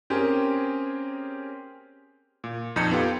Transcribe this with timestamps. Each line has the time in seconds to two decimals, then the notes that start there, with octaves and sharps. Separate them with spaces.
0.10 A#3 C4 C#4 G4 G#4 A#4
2.44 A#2
2.76 A#1 F2 D#4 G6 G#6 C#7
2.91 B3 F4 G4 A4